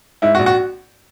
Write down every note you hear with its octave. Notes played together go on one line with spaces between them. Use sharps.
G#2 E4
F#4
A#1
F#4